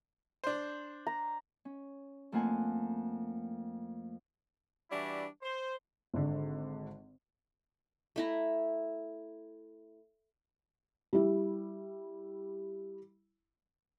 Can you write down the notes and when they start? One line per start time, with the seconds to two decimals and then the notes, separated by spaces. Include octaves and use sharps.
0.44 D4 C5
1.07 A#5
1.65 C#4
2.32 F2 A3 A#3 F4 F#5 G#5
4.90 E3 G3 D4 E4 F#4
5.42 C5
6.14 G#1 D3
8.16 A3 E4 A#5
11.13 G3 E4